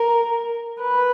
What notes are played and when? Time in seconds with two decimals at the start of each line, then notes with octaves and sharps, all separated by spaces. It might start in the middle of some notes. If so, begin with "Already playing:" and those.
Already playing: A#4
0.81 B4